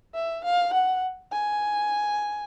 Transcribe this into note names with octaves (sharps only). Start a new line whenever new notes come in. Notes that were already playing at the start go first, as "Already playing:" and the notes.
E5
F5
F#5
G#5